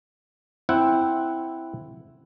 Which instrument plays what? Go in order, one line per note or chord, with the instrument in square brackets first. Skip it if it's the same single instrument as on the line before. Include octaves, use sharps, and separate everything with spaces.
[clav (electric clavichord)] C4 E4 F#5 G5